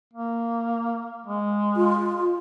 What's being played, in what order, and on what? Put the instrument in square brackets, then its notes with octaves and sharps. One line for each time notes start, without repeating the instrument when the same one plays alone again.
[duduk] A#3
G#3
[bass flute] F4